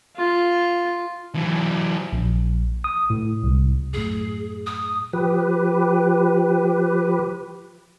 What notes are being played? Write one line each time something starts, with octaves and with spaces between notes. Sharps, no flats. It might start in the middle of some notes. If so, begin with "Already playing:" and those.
F4
E3 F#3
A#1
D#6
A2
C2
F#2 A2 G#4
D#6
F3 G4 B4